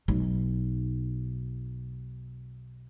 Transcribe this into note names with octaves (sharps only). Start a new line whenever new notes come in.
B1 D#4